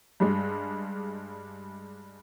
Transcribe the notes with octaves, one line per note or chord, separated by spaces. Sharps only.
G2 G3 G#3